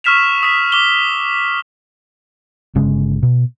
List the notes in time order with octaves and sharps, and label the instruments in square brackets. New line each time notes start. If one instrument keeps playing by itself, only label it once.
[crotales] C#6 E6 F6 B6 E7 F7
D#6 B6
D6 G7
[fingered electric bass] G1 C#3 G#3 C#4
B2